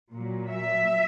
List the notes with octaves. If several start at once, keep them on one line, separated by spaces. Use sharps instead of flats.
A#2 F#3
E5